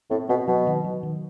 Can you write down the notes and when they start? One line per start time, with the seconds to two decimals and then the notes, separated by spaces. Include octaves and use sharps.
0.11 A2 C4
0.29 B2 C4
0.48 B2 F#3
0.67 D#3
0.84 F#3
1.03 D#3